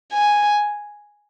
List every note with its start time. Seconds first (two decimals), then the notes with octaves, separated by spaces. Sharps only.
0.13 G#5